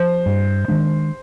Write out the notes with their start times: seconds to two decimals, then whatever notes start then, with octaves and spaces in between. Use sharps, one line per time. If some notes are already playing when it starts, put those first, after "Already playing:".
Already playing: F3 C5
0.26 G2
0.68 D#3 G#3 D4